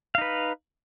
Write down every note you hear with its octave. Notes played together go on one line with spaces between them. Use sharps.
D#4 B4 F5